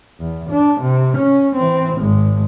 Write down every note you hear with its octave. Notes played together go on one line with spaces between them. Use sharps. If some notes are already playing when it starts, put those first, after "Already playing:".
E2
D4
C3
C#4
E3 C4
G#1 G#3